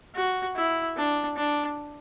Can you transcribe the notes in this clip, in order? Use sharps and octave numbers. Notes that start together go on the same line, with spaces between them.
F#4
E4
D4
D4